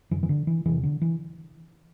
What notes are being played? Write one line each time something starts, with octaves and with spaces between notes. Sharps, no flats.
F#2 D3 E3
E3
D3
E3
E2 C3 E3
D3
E3